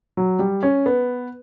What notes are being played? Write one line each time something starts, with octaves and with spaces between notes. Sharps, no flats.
F#3
G3
C#4
B3